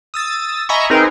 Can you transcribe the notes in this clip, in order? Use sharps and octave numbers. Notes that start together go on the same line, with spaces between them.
D#6 E6 A6
D#5 E5 G#5 A#5 B5 C#6
C4 D#4 G#4 A#4 B4